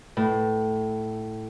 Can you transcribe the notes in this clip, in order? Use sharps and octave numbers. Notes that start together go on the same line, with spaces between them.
A2